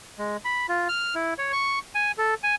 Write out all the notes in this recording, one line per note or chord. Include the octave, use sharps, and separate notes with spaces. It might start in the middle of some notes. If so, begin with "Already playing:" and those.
G#3
B5
F4
F6
E4
C#5
C#6
G#5
A4
G#5